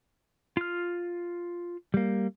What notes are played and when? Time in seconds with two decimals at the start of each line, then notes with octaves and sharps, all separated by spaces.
0.57 F4 F6
1.94 G3 A#3